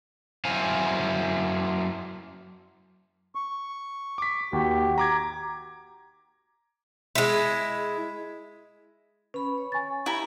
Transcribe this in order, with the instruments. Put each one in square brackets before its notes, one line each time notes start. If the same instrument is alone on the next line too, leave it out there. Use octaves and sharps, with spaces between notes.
[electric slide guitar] F#2 E4 C5 F5 G#5
[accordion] C#6
[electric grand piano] D6 B6
[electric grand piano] D#2 [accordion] F#4 G4
[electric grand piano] A#5 D6 G#6
[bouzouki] G#3 E4
[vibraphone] C#4 B5 C#6 [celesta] B4
[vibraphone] C#5
[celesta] G#5 C#6 A6
[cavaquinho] E4 A#5 [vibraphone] G4 C#6